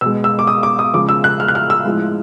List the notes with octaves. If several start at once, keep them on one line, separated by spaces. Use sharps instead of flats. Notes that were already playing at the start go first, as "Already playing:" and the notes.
B2 G#3 E6
E6
D6
D#6
D6
D#6
C#3 F3 G#3 D6
E6
F#6
F6
F#6
F6
E6
A2 F3 G#3